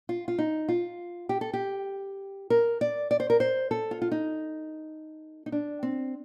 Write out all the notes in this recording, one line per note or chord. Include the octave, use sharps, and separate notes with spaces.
F4
F4
D#4
F4
G4
A4
G4
A#4
D5
D5
C5
A#4
C5
A4
F4
F4
D#4
D#4
D4
C4